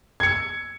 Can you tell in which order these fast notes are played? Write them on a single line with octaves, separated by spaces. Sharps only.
G#6 C#7 E6